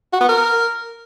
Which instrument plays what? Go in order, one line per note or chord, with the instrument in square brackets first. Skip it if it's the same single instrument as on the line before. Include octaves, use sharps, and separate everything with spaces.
[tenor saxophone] F#4
B3
A#4